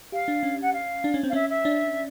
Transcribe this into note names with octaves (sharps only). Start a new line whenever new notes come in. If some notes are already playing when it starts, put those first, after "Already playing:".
G4 F5
D4
C#4
F#5
F5
D4
C#4
C4
F5
C#4 E5
E5
D4